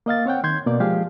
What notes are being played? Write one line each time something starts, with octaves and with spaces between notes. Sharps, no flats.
A#3 D#5 F5 A6
C4 C#5 F#5 G5
D#3 C6 G6 G#6
B2 A#3 B3 D5
F3 G#3 G4 G#4 F5